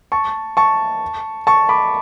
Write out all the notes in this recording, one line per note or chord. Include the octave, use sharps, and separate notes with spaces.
A5 C#6
A5 C#6
A5 C#6
B5 D6